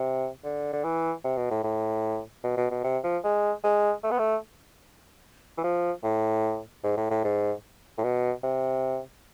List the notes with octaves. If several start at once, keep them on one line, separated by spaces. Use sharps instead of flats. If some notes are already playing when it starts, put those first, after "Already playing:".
Already playing: C3
D3
D3
E3
C3
B2
A2
A2
B2
B2
B2
C3
F3
G#3
G#3
A3
B3
A3
E3
F3
A2
G#2
A2
A2
G#2
A2
B2
C3